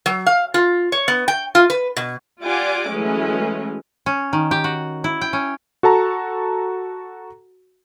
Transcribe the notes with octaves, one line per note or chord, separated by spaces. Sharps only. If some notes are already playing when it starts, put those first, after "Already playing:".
F#3
F5
F4
C#5
B3
G5
F4
B4
B2
F4 G4 D5 F#5 G#5 D6
E3 F#3 G#3 A3 C#4
C#4
D#3
G4
F#4
E4
G5
C#4
F#4 A4 A5 A#5